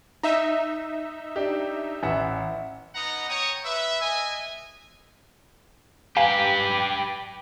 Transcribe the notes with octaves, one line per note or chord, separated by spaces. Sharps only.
D#4 E5
D4 G4
A1 E5 F#5
B3 D#4 D#5 F#5 A#5
C#5 G5 A#5 C#6 D#6
B4 E5
D#5 E5 G#5
G4 B4 F5 G5 G#5 A#5